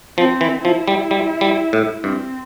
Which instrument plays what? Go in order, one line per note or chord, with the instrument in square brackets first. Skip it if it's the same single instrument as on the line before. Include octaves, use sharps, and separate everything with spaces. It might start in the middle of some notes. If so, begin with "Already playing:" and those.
[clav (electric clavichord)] F3 [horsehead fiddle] C4
[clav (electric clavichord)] E3
[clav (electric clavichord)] F3 [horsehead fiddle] E4
[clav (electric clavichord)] G3
G3
G3
A2
[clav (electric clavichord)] G2 [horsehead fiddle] C4